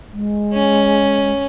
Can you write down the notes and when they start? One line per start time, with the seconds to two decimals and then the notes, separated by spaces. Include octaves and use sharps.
0.13 G#3
0.54 C#4